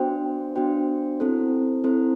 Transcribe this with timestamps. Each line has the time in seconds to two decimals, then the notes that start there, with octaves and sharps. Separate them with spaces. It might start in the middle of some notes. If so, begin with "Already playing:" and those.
Already playing: B3 D4 F#4 C5 G5
0.55 B3 D4 F#4 C5 G5
1.20 C4 E4 A4 C5
1.84 C4 E4 A4 C5